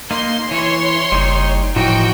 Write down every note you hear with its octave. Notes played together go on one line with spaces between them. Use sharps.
A#3 D#4 C6
E3 C#5 C6
F#1 G3 D#4
A2 E3 F3 D#4 F#4 G5